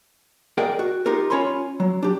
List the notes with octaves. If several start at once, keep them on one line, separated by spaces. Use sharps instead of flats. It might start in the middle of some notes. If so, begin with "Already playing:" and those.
G#4 A#4 D5 D#5 F#5 G5
F#4
D#4 F4 G4 A#4
C#4 F4 C#5 G#5 B5 C6
F#3
D4 G4